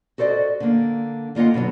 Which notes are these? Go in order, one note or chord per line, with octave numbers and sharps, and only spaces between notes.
F#4 A4 C5 D5 D#5
D3 A#3
D3 A#3 F4 D#5 F#5
B2 D3 E3 F#3